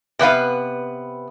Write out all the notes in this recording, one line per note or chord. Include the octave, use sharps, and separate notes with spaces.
C3 B3 B4 F5